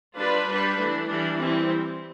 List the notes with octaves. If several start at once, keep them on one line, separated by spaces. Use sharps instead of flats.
G3 D4 F4 B4 D5
G3 D4 G4 B4
E3 A3 D4
E3 G3 D4
E3 G3 C4